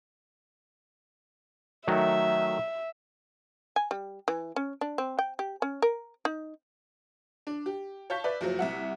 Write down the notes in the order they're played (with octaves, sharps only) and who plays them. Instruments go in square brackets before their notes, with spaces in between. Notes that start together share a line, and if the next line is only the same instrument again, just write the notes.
[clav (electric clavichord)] D#3 F#3 A3 [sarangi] E5
[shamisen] G#5
G3
E3
C#4
D4
C4
G5
G4
C#4
A#4
D#4
[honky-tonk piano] D4
G4
C#5 F5 A5 G6 B6
B4 D5 E5
F#1 F3 F#3
C2 E5 F#5